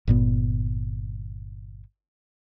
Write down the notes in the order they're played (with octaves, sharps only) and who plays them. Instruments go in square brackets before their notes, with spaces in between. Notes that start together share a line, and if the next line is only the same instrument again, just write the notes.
[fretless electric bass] G1 A#2 B3